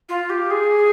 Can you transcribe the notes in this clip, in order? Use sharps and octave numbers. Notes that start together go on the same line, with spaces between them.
F4
G4
G#4